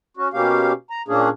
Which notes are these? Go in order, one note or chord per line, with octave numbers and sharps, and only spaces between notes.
C#4 F#4
B2 A#3 C#4 G4 F5
A#5
A#2 A#3 C#4 D4 G#4